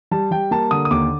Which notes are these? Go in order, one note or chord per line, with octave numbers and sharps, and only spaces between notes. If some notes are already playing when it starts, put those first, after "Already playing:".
G3 A5
G3 G5
A#3 A5
D3 D#6
D#6
D#2 D6